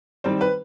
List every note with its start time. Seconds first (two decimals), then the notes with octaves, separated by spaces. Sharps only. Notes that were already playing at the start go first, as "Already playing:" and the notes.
0.24 D#3 G3 C4 C5
0.41 B4